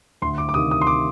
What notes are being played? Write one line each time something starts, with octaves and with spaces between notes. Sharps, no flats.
D2 C6
D6
D6
C3 D#3 D#6
D#6
C6
D6